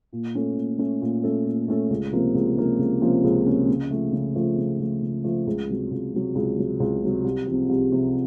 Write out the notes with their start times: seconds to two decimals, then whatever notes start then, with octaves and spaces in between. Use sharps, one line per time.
0.13 A#2
0.35 A3 C#4 A4
0.57 A#2
0.79 A3 C#4 A4
1.01 A#2
1.24 A3 C#4 A4
1.45 A#2
1.68 A3 C#4 A4
1.90 C#2
2.12 C3 F3 A#3 C#4
2.35 C#2
2.57 C3 F3 A#3 C#4
2.79 C#2
3.01 C3 F3 A#3 C#4
3.24 C#2
3.46 C3 F3 A#3 C#4
3.68 C#3
3.91 F3 A3
4.12 C#3
4.35 F3 A3
4.58 C#3
4.80 F3 A3
5.02 C#3
5.24 F3 A3
5.47 C#2
5.69 C3 F#3
5.91 C#2
6.14 C3 F#3
6.35 C#2
6.58 C3 F#3
6.80 C#2
7.02 C3 F#3
7.24 C2
7.47 C3 F3
7.69 C2
7.91 C3 F3